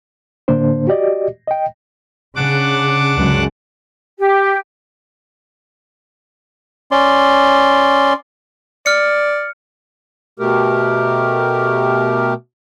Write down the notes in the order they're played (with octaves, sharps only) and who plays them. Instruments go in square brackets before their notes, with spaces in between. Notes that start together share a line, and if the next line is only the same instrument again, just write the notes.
[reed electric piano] A2 D3 A#3 D4 C5
F#4 G4 D5 D#5
D#5 G5
[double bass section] C#3 [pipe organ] D4 F#5 D6
[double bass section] C#2 F#2 C#3
[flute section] G4
[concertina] C#4 D5 C6
[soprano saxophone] D5 [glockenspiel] F6 C#7
[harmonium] B2 A3 G4 A#4